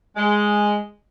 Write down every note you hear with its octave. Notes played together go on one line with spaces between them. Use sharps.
G#3